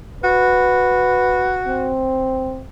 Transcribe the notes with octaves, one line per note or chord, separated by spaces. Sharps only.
F#4 B4
C4